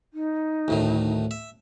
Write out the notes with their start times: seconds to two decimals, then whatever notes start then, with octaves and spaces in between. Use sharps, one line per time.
0.13 D#4
0.68 D2 A2 D#3
1.31 E5